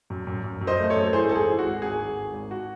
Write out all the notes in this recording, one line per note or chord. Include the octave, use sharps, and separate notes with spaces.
F#2
F#2
F#2
F#2
C5 D#5
A3
A4 C#5
F#2
E3 G#4 C5
G#1 A4
G#4
E3
F#4
G#1
G#1 G#4
G#1
G#1
G#1
F#4